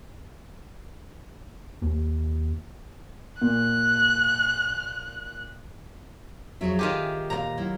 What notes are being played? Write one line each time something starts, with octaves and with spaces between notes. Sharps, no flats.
D#2
A#2 F#6
F2 F#3 G#4 C#5 E5
D#3 F4 G4 G#5
A#2 C5 F5 A#5
F#3 E4 F4